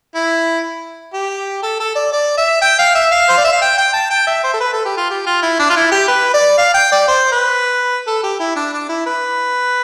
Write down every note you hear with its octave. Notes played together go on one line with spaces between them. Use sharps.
E4
G4
A4
A4
D5
D5
E5
G5
F5
E5
F5
C5
D5
E5
F5
G5
G5
A5
G5
E5
C5
A4
B4
A4
G4
F4
G4
F4
E4
D4
F4
E4
G4
B4
D5
F5
G5
D5
C5
B4
A4
G4
E4
D4
D4
E4
B4